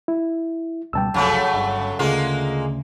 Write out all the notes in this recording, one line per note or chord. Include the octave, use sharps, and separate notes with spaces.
E4
C#2 B2 G3 G5 A5 E6
F#1 C2 F2 C#3 F#3 A3
G1
D2 C#3 G#3 A#3 F4 G#4